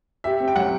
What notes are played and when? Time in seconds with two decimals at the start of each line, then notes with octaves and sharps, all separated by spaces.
0.24 G4 E5
0.40 C4
0.48 G5
0.56 F#3 F#5